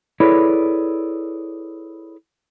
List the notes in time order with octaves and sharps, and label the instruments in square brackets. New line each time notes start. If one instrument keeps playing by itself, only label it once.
[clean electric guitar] E4 G#4 A4 B4 C#5 D5